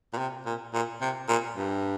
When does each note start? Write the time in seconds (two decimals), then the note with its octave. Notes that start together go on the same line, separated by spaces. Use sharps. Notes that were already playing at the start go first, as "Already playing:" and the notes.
0.14 A#2
0.18 C3
0.46 A#2
0.74 A#2
1.02 C3
1.29 A#2
1.56 G2